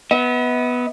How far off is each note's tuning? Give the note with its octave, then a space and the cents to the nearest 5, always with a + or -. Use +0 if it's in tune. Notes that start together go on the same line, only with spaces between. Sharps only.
B3 +0 E5 -45